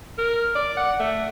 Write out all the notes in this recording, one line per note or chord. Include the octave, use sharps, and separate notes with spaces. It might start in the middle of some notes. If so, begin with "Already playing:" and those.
A#4
D5
F#5
A3